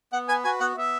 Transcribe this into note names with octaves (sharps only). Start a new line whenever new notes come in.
B3 F#5
B4 G#5
F#4 G#5
B3 F#5
B3 E5